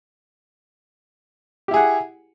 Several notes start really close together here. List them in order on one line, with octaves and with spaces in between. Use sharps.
G4 E4 G#4 F#5